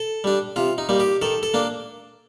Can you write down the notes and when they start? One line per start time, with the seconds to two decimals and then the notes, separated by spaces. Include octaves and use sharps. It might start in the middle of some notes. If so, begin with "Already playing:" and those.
Already playing: A4
0.24 G3 D4
0.56 C3 F4
0.78 D#4
0.89 G3 A#3 D#4
1.00 G4
1.22 D#3 A4
1.43 A4
1.54 A#3 D4